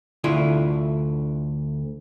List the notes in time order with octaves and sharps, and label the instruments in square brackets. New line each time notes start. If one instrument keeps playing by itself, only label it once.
[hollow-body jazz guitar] D2 D3 E4 F4